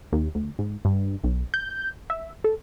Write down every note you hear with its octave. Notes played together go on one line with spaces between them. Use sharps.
D#2
D2
G#2
G2
B1
G6
E5
A4